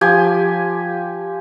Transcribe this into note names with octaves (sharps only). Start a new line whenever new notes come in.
F3 G4 G#5